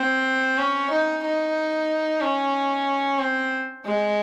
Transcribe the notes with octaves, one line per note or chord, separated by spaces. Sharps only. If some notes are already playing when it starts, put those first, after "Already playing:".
Already playing: C4
C#4
D#4
D#4
C#4
C4
G#3